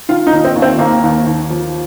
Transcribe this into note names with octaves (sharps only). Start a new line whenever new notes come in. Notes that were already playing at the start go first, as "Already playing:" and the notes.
D#3 F4
D#4
D#2
C4
D#2
C4
D#2 A#3
D#2
D#2
F3